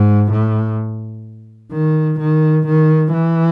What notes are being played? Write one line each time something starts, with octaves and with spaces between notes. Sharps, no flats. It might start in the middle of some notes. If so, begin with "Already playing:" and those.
Already playing: G#2
A2
D#3
D#3
D#3
E3